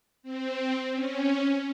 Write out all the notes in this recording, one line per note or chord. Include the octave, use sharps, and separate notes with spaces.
C4
C#4